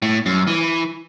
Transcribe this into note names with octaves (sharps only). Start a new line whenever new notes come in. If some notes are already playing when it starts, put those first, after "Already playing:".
A2
F#2
E3